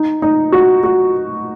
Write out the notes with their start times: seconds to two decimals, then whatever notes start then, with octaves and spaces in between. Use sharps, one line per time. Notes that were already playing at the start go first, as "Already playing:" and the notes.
Already playing: D#4
0.22 D#4
0.52 F#4
0.83 F#4